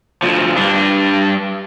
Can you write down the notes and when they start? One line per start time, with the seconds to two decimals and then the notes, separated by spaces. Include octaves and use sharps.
0.22 D2 F3
0.56 G2 D4